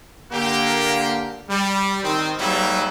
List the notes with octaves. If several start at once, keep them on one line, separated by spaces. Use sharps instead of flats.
D3 A#3 G4
G3
D#3 C4
G#2 F#3 G3 A#3 D#4 E4